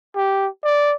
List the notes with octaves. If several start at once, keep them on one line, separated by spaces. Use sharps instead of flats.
G4
D5